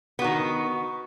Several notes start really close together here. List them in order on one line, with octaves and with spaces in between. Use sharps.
B3 F#4 D#3